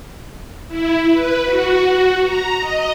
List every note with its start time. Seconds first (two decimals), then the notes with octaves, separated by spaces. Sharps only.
0.68 E4
1.09 B4
1.45 F#4
1.84 F#4
2.22 A#5
2.59 D#5